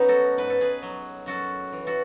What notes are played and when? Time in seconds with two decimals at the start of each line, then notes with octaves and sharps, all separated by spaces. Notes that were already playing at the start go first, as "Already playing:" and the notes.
Already playing: F#3 B3 C#4 D#4
0.08 F#4 A4
0.37 G#2 B4
0.50 A4
0.61 G#4 B4
0.82 F#3
1.26 F#2 F#4 A4
1.72 E3
1.87 F#4 A4